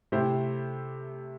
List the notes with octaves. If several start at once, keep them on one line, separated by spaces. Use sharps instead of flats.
C3 A3 E4 G4 C5